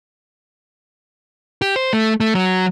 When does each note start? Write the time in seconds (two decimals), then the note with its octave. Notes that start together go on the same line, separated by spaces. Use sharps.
1.62 G4
1.76 C5
1.93 A3
2.20 A3
2.35 F#3